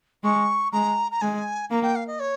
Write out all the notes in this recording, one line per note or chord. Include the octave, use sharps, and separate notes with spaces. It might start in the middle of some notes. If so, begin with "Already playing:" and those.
G#3 C#6
G#3 A#5
A#5
G#3 G#5
A#3 A#5
G5
F5
D#5
C#5